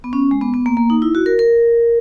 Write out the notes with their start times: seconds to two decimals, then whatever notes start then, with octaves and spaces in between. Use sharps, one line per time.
0.04 B3
0.13 C#4
0.31 G#3
0.41 B3
0.54 B3
0.66 A#3
0.77 A#3
0.90 D#4
1.02 E4
1.15 F#4
1.26 A#4
1.39 A#4